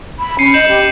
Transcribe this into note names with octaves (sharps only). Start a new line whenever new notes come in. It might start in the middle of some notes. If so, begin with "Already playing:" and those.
B5
C#4 C7 C#7 D#7
D#5 G6 E7 F#7
G4